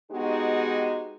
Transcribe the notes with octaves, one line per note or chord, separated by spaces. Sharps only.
G#3 B3 D#4 F#4 G4